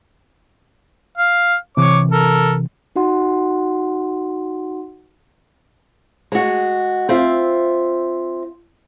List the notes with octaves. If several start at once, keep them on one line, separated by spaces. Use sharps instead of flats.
F5
C3 E3 C#5 D6
A4 A#4
D#4 F#4 F#5 C6
G#3 F#4
C4 F4 E5